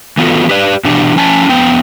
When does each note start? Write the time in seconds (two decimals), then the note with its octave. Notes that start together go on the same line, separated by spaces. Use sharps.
0.17 E3 B3 F4 F#4 A4
0.49 G4 B4 D5
0.85 B2 E3 D4 G4
1.16 F3 C#4 G#5 A5
1.49 F2 B3 G5